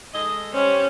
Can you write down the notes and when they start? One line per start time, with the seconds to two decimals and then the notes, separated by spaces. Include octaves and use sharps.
0.14 G#3 A4 D#5
0.54 G3 C#4 C5